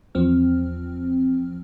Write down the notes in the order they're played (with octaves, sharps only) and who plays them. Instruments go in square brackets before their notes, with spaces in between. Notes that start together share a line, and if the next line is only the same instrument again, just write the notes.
[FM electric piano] E2 F3 C4 F6